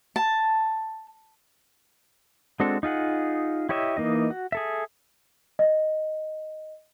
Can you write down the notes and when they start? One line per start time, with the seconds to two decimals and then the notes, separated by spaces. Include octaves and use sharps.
0.16 A5
2.60 G#3 C4 D4 F#4 A4
2.83 D#4 F4 G#4 F#5
3.69 E4 G4 C#5 D#5 E5
3.97 E3 A#3 D#4 D#5
4.30 F#4
4.52 G#4 A4 E5
5.59 D#5